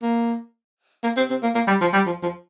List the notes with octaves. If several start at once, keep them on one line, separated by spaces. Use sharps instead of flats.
A#3
A#3
C4
C4
A#3
A#3
G3
F3
G3
F3
F3